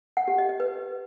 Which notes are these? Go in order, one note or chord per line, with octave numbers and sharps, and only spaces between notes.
F#5
G4
D#5
D#5
B4